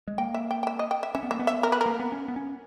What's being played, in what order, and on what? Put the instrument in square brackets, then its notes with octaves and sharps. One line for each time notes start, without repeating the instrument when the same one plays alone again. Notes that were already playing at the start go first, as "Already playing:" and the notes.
[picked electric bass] G#3
[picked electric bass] A#3 [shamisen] G5
[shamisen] E5
G5
G5
E5
D#5
G5
E5
[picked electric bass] C#4 [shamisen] E5
[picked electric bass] B3
[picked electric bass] A#3 [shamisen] E5
[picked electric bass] B3
[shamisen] E5
A#4
B4
A#4
[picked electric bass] A#3
B3
C#4
B3
C#4